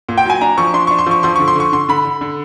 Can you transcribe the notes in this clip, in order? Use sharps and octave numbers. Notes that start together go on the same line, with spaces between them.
A#2
G5
F#3 G#5
D4 A#5
F3 C#6
D4 C6
D4 C#6
C6
F3 C#6
F3 C6
D3 C#6
C6
D3 C#6
D3 C6
D3 B5
D3
D3